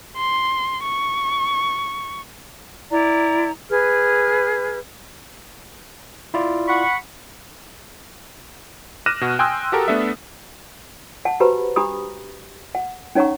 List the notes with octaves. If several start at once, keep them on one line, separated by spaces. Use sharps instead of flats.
C6
C#6
E4 D5 A#5
G#4 B4 F6
E4 F4 D5
F#5 B5 C#6
D6 F6 F#6 A#6 D#7 E7
B2 F#4
G5 G#5 C6 D#6 E6 F#6
F#4 G4 A4 A#4
A3 B3 D4 A4 E5
F#5 A5
F#4 G4 B4 C5 A#5 B5
D4 G4 A#5 B5 D#6
F#5
C#4 D#4 C#5 F#5 A#5 C#6